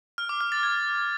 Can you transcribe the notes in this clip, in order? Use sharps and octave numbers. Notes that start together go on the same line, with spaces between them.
F6
D6
F6
A6
G#6